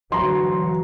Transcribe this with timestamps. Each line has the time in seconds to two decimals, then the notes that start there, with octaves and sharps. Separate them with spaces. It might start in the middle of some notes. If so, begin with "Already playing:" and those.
0.12 D2 E3 F#3 A#5 C6